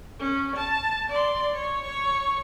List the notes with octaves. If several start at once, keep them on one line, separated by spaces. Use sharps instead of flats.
C#4
A5
D5 C6
C#5
C#5 C#6